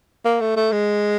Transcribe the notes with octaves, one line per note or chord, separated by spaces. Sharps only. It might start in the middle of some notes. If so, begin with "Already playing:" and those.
A#3
A3
A3
G#3